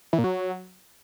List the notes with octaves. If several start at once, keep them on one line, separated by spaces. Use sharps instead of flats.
E3
A#2
F#3